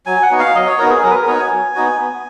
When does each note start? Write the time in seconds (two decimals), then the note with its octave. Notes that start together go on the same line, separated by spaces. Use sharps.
0.06 F#3 G#5
0.23 F#5
0.31 B3 D#4 F#4
0.39 F5
0.55 F#3 D#5
0.67 C#5
0.78 B3 D#4 F#4 A#4
0.91 G#4
1.03 F#3 A#4
1.10 B4
1.15 A#4
1.26 B3 D#4 F#4 C#5
1.39 G#5
1.51 F#3
1.75 B3 D#4 F#4
1.99 B3